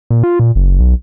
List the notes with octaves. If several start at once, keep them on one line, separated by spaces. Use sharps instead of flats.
A#2
F4
A#2
F#1
B1